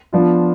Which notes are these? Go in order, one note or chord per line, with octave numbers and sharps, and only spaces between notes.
F3 B3 D4 F4